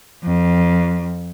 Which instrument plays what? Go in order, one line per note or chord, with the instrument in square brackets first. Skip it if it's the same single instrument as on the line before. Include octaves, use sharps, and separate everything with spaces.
[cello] F2